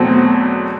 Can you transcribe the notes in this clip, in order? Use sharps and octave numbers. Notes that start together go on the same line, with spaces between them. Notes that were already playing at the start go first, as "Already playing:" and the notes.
Already playing: E2 B2 F#3 A3 C4